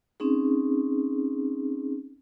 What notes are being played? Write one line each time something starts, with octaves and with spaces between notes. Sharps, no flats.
C4 C#4 D#4 G#4